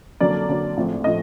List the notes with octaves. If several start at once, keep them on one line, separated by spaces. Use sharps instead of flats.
F2 D3 F#3 A#3 D5
F2 D3 F#3 A#3
A#1 A2 F3 A3 C4
A2 F3 D#5